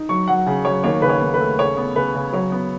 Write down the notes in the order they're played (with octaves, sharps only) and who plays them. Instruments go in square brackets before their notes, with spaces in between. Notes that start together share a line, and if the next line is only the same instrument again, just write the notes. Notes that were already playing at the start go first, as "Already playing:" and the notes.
Already playing: [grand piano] D#4
F#3 C#6
F#3 F#5
C#3
F#3 C#5
D#2 C#5
C#3 B4
C#5
D#2
B4
A3
C#3 C#5
B3
C#3 B4
C#3
F#3 C#5
B3